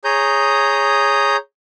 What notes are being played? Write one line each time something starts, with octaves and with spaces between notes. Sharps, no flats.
G#4 C#5 A#5 D#6 G6